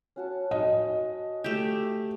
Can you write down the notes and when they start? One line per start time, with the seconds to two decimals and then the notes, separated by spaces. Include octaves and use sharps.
0.16 C#4 F#4 A5
0.51 D#5
1.44 A3 G4